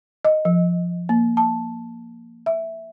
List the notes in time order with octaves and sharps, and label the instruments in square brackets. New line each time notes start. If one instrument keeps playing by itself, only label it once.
[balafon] D#5
F3
A#3
A5
E5